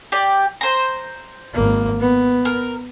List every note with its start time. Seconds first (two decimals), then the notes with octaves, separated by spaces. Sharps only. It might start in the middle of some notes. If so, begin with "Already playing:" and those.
0.12 G4 D5
0.61 C5 A#5
1.53 G#1 A#3
2.00 B3
2.45 A#4